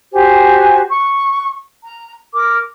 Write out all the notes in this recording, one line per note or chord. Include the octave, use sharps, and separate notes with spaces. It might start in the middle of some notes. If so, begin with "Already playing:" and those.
F#4 G4 C5 G#5
C#6
A#5
A#4 D6